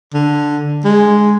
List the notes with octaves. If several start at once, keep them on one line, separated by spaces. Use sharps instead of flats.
D3
G#3